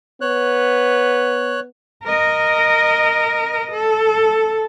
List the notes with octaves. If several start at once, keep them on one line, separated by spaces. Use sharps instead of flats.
B3 C#5 F#6
A#4 D#5
A4